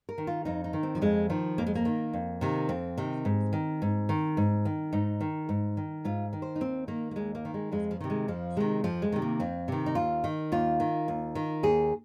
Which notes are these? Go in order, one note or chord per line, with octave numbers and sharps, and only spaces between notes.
A#4
D#3
F4
F2 D#4
D#4
D#3
C4
F3
F2 G#3
D#3 F3
F2 A#3
G#3
A#3
D#3
F2
C3 D#3
F2 C4
C3 D#3
G#2
D#3
G#2
D#3
G#2
D#3
G#2 D#4
D#3
G#2
D#3
G#2 F4
D#3
C5
D#4
D#2 C4
D#3 A#3
A#3
D#2 G#3
A#3
D#3
G#3
F2 G#3
F3
C3 D#3
G#3
F2 F3
C3 D#3 G#3
F2 F3
G#3
C3 D#3
A#3
F2 C4
C3 D#3
D#4
D#2 F4
D#3
D#2 F4
D#3
D#2
D#3
D#2 G#4